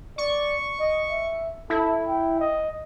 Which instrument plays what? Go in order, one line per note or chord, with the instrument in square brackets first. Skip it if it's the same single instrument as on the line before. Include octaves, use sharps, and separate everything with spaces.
[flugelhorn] D5 [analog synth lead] C#6
[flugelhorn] D#5
E5
[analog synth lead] E4 [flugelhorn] A4
[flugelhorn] G5
D#5